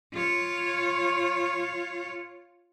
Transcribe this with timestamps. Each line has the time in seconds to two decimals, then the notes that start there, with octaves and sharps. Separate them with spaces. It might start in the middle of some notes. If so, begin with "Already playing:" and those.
0.13 F4 C#5